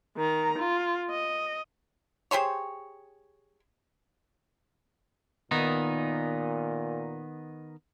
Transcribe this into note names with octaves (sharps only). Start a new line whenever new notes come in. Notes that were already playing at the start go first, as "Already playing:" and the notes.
D#3 A#5
F4
D#5
G4 G#4 C5 C#5
A#2 D#3 B3 D#4